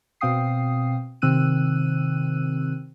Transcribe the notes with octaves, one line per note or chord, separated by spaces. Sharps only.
B2 C4 F5 G5 D#6 C7
C3 D#3 C4 E6 F#6 D#7